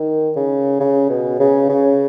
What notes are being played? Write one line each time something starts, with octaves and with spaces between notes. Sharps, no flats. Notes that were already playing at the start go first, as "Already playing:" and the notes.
Already playing: D#3
C#3
C#3
B2
C#3
C#3